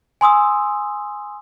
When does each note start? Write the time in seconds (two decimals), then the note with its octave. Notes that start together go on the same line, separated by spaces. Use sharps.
0.21 G#5 C6 D#6 E6